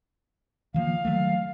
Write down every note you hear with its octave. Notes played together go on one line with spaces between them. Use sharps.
D#3 F3 A#3 F5
D#3 F#3 A3